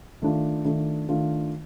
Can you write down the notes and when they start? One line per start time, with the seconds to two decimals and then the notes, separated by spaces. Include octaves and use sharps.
0.22 D#3 A3 D4 F4
0.65 D#3 A3 D4 F4
1.09 D#3 A3 D4 F4